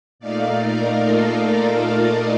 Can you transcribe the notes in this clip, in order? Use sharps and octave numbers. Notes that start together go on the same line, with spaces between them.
A#2 A3 D#4 D5 F5
A#4 D5
F4 A4